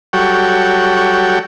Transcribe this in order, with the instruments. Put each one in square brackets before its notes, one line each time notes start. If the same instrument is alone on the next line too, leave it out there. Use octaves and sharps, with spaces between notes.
[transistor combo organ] F#3 G3 F#4 A4 C#5 G5